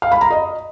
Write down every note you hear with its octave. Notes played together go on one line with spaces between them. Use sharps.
F5
B5
A#5
D#5